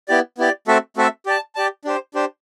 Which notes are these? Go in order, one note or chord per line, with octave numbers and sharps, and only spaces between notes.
B3 E4 G4 D5
B3 E4 G4 D5
A3 C4 F#4 A4 E5
A3 C4 F#4 A4 E5
G4 D5 A5
G4 D5 A5
D4 G4 C5
D4 G4 C5